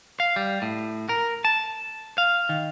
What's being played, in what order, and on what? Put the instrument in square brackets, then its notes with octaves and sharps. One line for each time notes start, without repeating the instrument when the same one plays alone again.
[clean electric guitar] F5
G3
A2
A#4
A5
F5
D#3